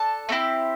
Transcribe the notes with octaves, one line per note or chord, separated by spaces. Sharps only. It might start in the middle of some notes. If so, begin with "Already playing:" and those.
Already playing: D4 A4 A5
A3 C4 E4 G4